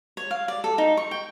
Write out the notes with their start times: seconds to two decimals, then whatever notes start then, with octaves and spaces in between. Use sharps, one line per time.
0.17 C#5
0.31 F5
0.48 D5
0.64 A4
0.78 D#4
0.97 C#6
1.11 G5